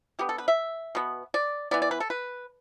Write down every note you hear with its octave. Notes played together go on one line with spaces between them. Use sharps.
D3 B3 G4
A4
B4
E5
B2 B3
D5
E3 B3 D5
D5
B4
A4
B4